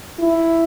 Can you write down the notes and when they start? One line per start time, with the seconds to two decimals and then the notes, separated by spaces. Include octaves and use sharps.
0.19 E4